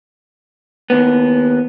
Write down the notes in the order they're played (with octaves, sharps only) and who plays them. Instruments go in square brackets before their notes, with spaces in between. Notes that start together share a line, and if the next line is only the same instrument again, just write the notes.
[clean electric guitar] D#2 B3